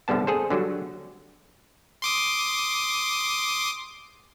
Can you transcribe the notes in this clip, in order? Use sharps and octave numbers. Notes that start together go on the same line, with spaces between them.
C2 G2 D3 G3 B3 A5
G#4 A4 C5
D3 F#3 G3 F#4
C6 D6 D#6